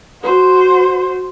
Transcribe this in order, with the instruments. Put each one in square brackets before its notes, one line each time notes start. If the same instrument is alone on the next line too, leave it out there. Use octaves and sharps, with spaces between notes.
[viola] F#4 C5